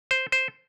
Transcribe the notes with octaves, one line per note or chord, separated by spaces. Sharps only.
C5
C5